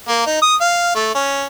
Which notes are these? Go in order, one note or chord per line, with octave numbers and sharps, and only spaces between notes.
A#3
D#4
D#6
F5
A3
C#4